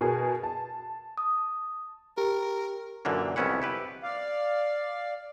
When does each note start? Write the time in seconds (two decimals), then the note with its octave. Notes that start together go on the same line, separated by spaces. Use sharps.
0.01 B2 G#4 A#4
0.43 A5
1.18 D#6
2.18 G4 A#4
3.05 F#2 A#2 D3 E3 A#3
3.36 C2 F2 B3 C#4 E4 F#5
3.62 E4 G4 B4
4.03 D5 F5